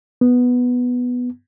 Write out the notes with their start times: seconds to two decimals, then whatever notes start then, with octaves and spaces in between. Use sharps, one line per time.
0.21 B3